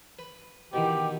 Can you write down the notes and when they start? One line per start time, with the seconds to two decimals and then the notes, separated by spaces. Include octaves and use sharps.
0.19 B4
0.73 B2 D#3 E3 G4